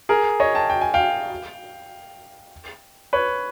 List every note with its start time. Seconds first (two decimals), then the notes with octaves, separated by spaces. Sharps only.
0.09 G#4 A#4
0.40 C#5 D#5
0.54 G5 A5
0.70 G5
0.81 G#5
0.94 F5 G5
3.13 B4 C#5